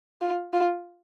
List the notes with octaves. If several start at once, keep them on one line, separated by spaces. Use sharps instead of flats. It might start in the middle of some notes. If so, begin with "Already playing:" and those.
F4
F4